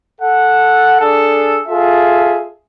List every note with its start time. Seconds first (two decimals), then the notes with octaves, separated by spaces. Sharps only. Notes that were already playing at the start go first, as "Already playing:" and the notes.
0.21 A4 F#5
1.00 D4 G#4 A4
1.68 F4 G#4 A4 E5